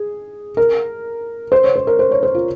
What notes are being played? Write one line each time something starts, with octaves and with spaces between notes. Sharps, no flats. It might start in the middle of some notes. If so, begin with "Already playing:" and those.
Already playing: G#4
A#4
C5
C#5
C5
A#4
C5
C#5
C5
F4